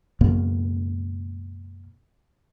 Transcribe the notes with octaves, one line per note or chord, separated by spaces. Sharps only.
C#2 F#2 B2 A#3